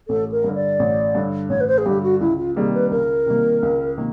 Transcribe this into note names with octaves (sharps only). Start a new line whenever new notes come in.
A1 A4
A#4
G2 D3
D5
A1
G2 D3
A1 C#5
B4
C5
G#4
G2 D3 G4
F#4
C#2 E4
F4
C3 D#3 G3 A#3 G#4
B4
C#2 A#4
C3 D#3 G3 A#3
C#2
C3 D#3 A#3